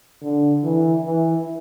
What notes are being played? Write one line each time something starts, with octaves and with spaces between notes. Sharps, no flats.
D3
E3
E3